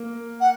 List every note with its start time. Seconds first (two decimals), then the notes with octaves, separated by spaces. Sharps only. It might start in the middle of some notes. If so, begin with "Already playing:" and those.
Already playing: A#3
0.41 F#5